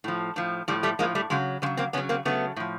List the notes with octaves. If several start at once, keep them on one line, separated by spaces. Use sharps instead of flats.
A2 F3
A2 F3
A2 F3 G3
G3 A3
A2 F3 G#3 A#3
G3 A3
C#3 F#3 G#3
C#3 F#3 G#3
A#3 C4
C#3 F#3 B3 C#4
A#3 C4
C#3 F#3 A3 B3
A2 F3